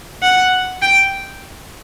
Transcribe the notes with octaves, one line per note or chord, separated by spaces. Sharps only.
F#5
G5